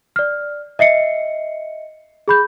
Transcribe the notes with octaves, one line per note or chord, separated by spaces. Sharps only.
D5 F6
D#5 E5 C7 C#7
G#4 B5 G6